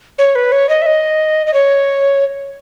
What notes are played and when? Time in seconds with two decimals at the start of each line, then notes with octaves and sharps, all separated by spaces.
0.18 C#5
0.35 B4
0.52 C#5
0.69 D#5
0.82 E5
0.86 D#5
1.47 D#5
1.54 C#5